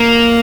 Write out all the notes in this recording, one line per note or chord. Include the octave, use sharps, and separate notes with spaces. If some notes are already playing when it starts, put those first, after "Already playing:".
Already playing: A#3